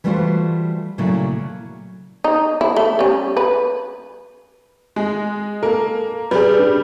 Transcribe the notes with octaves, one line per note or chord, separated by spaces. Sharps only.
E3 G3 A3 F4 F#4 C5
A#2 C#3 F#3 A3 E4
D#4
E4
A3
G3 C#4
B4
G#3
A#3 A4
G3 G#4 B4
D4